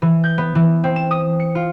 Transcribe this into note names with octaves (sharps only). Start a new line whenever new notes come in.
E3
G6
B3
E3
C4
E7
D#6
C#7
F4